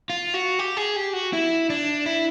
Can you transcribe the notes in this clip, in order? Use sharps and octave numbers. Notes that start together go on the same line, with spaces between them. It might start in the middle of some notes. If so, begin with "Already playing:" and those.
F4
F#4
G4
G#4
G4
F#4
E4
D4
E4